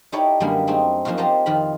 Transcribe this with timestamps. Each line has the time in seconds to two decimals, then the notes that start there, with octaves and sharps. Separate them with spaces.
0.12 D#4 E4 G4 A4 C#5 D5
0.40 F#2 D3 G3 G#3 A#3 B3
0.67 A3 C4 D#4 G#4
1.05 F#2 F3 A#3 D#4 F4 F#4
1.17 A#3 G4 C5 D#5 A5 A#5
1.46 F2 D#3 F4 A#5 B5